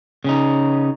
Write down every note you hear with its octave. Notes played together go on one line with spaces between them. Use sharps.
C#3 C#4 D#4